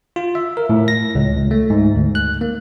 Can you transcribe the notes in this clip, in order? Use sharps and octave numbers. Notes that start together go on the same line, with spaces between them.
F4
E5
A#4
A2
A#6
C#2
C#2
A3
G#2
D2
F#6
A#3